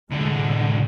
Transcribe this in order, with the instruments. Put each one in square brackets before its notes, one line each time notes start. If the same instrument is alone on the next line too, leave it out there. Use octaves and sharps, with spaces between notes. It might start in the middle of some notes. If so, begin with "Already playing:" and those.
[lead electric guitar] C2 D3 [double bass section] A2 G#3